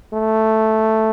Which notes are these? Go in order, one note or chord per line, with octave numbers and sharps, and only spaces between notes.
A3